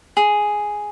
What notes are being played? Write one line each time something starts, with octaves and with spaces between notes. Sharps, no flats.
G#4